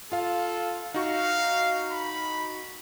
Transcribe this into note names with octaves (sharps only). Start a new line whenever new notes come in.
F4 A4 F5
D#4 F#4 F5 C#6
B5